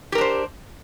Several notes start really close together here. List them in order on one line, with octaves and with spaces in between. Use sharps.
G4 A#4 D4 C5